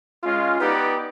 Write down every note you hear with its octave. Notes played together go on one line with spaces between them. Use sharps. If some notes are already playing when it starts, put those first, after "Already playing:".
G#3 C#4 F4
B3 D#4 G4 B4 D5